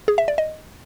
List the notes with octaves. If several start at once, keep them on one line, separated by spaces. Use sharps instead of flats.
G#4
E5
D5
D#5